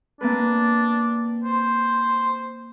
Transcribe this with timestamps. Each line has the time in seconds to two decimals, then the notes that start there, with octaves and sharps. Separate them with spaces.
0.21 A#3 C4 D4 B4
1.44 C5